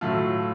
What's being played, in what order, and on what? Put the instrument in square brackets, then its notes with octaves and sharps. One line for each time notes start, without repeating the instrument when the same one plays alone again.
[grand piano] A2 F#3 A3 F4